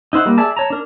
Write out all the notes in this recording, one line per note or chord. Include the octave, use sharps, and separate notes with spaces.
D#4 E4 C5 F#5
G3 A#3
G#4 D5 E5 A5
C#5 A5 A#5
D4 A#4